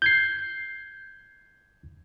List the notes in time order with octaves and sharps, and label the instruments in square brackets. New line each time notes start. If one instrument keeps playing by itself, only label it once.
[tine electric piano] G6 G#6 C7